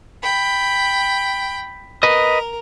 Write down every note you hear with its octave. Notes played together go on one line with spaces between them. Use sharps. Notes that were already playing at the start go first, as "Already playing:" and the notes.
G5 B5
A#4 B4 D#5